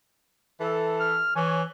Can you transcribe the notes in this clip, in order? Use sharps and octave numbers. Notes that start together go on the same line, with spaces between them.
E3 A4
F6
E3 C#5 G#5